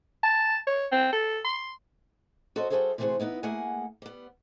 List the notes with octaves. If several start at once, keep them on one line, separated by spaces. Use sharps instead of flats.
A5
C#5
C4
A4
C6
F#4 A4 A#4 C5 C#5 D#5
G3 F#4 G#4 A4 C5 E5
C3 E3 A3 F#4 G#4 C5
E3 B3 D#4 E4
A3 A#3 G#4 F#5 G#5
G3 B3